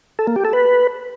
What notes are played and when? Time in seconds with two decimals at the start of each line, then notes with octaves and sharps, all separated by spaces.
0.19 A4
0.27 A#3
0.36 G4
0.45 A4
0.53 B4